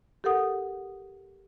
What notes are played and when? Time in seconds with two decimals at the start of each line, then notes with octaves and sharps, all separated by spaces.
0.24 G4 A4 A#4 F#5 D#6